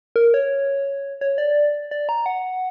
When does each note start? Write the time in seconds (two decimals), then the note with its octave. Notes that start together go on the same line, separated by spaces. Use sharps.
0.16 A#4
0.34 C#5
1.21 C#5
1.38 D5
1.91 D5
2.09 A#5
2.26 F#5